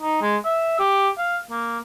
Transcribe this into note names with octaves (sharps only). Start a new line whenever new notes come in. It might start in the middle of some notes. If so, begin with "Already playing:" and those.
D#4
G#3
E5
G4
F5
A#3